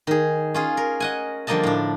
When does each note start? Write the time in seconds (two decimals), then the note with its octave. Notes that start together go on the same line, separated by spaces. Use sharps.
0.07 D#3 G#4
0.54 C#4 F4 G#4
0.77 A#4
1.00 D#5 F#5 G#5
1.47 D3 F3 G3 A#3 D#5 A5
1.63 A2 D4